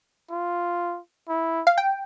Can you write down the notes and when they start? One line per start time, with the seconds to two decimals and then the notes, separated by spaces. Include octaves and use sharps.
0.31 F4
1.29 E4
1.67 F5
1.78 G5